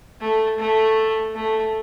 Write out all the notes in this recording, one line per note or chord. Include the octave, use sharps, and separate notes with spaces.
A3
A3
A3